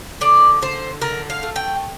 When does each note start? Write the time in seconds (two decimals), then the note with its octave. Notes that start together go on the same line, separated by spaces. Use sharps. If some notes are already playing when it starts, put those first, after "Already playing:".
0.21 D3 D5
0.62 D3 C5
1.02 D3 A#4
1.30 F5
1.43 A3
1.56 G5